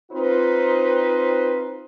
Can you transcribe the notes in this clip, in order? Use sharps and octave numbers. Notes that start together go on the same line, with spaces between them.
C4 D#4 F4 B4 C5